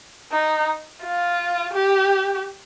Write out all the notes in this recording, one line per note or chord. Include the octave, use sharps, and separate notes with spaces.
D#4
F4
G4